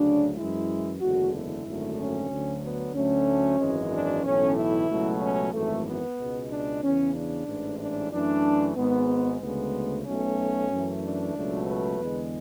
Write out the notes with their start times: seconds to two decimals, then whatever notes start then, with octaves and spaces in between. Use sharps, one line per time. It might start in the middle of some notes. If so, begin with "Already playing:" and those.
Already playing: D2 C#3 F#3 D4
0.36 F#2 E3 G#3 E4
1.00 F#1 E2 D3 G#3 F#4
1.34 E4
1.65 G#1 F#2 D3 A3
1.98 C#4
2.30 D2 D3 F#3
2.63 B3
2.95 D2 D3 F#3 A3 C#4
3.59 G#1 F#2 E3 G#3
3.92 D4
4.23 B1 A2 E3 A3 C#4
4.57 E4
4.89 C#2 B2 F#3 A3
5.22 C#4
5.53 G#1 F#2 E3 A3
5.86 B3
6.18 C#2 B2 G#3
6.50 D4
6.83 E2 C#3 E3 C#4
7.15 D4
7.47 A1 G#2 E3
7.80 D4
8.12 F#2 E3 A3 D4
8.76 G#1 G#2 G#3 B3
9.41 D2 C#3 G#3 B3
10.06 B1 B2 A3 C#4
10.71 F#2 E3 A3
11.03 D4
11.35 C#2 B2 F#3 A3
11.67 B4
12.00 E2 D3 G#3